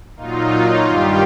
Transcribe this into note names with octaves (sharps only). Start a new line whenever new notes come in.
A#2 F#3 D#4 F4
G2 D#3 G3 F4 G4